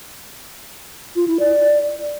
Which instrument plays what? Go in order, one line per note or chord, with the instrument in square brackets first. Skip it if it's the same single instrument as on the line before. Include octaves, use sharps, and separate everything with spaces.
[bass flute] F4
E4
D5